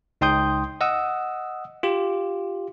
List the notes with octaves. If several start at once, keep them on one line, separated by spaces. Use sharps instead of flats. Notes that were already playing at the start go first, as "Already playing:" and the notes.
C#2 D#4 G5 C6 D#6 G6
D#5 F#5 D#6 E6
F4 G4